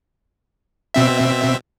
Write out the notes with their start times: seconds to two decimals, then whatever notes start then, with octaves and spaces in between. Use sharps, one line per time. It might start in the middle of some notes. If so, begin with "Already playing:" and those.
0.94 B2 C4 E5